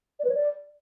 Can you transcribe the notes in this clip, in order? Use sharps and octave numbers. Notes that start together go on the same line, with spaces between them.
D5
B4
C#5
D5